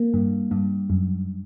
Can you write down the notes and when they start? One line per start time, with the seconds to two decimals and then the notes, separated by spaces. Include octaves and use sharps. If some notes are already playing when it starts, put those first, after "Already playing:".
Already playing: A#3
0.14 G2
0.51 G2
0.90 F#2